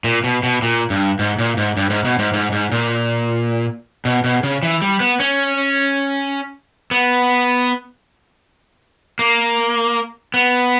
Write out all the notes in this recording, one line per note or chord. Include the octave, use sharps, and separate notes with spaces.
A#2
B2
B2
A#2
G2
G#2
A#2
G#2
G2
G#2
B2
G#2
G#2
G#2
A#2
B2
B2
C#3
E3
G3
B3
C#4
B3
A#3
B3